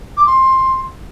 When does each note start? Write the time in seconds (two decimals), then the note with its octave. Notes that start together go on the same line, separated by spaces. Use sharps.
0.17 D6
0.26 C6